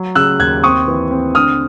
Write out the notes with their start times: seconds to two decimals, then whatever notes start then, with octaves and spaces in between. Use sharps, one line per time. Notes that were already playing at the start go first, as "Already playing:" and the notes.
Already playing: F#3
0.15 C#3 E6 F#6
0.39 D#2 F#6 G#6
0.63 C4 C#6 D#6
0.88 E3
1.11 C4
1.35 D3 D#6 F6